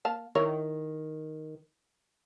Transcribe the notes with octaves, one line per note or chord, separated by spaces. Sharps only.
A#3 F5 A5
D#3 E4 A#4 C#5